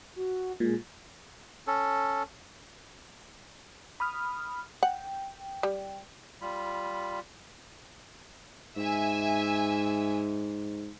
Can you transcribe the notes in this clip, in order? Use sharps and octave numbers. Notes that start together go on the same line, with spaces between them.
F#4
A#2 G#3
C#4 A4
B5 D#6 F6
F#5 G5
G3
G3 F4 B5
G#2 E5 G#5